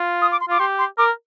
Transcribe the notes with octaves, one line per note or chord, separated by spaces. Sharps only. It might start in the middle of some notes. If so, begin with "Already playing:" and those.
Already playing: F4
D#6
D6
C6
F4 D6
G4 C6
C6
A#4 D6